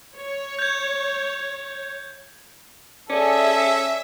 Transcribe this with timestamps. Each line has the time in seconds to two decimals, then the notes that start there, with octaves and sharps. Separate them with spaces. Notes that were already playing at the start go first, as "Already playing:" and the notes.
0.17 C#5
0.59 G6 G#6
3.10 C#4 G#4 A4 D5 E5 G#5